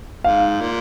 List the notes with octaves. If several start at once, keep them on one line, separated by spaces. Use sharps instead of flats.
G#2 F5
A#2